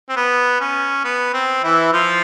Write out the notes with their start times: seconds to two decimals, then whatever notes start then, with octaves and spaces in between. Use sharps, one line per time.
0.09 C4
0.17 B3
0.61 C#4
1.05 B3
1.34 C4
1.63 E3 E4
1.93 F3 F4